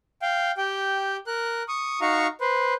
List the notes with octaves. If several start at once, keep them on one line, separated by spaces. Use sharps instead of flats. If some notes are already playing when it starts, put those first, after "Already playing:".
F5 G5
G4 G5
A#4 F#6
C#6 D#6
D#4 F#4 F5 A#5 C#6
B4 C5